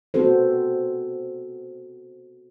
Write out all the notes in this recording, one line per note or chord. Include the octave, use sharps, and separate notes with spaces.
B3 C4 F#4 A4 C5